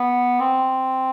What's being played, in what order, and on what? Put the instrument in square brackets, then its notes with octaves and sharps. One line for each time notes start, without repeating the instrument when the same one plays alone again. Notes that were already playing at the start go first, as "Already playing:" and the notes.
Already playing: [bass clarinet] B3
C4